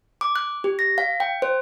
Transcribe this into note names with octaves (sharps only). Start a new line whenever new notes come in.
D6
F#6
G4
A#6
F5
G5
C5